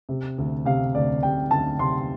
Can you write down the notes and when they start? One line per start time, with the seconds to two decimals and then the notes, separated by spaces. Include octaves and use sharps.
0.09 C3
0.38 D2
0.65 C3 F5
0.95 D2 D5
1.23 C3 G5
1.51 D2 A5
1.79 C3 C6